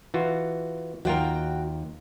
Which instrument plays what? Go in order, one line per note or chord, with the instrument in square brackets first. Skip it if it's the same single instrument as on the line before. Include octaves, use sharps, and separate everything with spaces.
[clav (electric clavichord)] E3 F4 F#4
[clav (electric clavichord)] D#2 F4 A#4 [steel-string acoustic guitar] F#4 G5